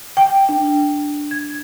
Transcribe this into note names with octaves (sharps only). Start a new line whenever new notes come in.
G5
D4
G#6